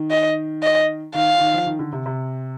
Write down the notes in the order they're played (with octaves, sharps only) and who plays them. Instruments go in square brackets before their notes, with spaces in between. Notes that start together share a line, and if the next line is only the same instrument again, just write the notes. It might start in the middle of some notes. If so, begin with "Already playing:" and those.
Already playing: [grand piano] D#3
[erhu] D#5
D#5
[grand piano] D#3 [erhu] F5
[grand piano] D#3
F3
D#3
D3
C3
C3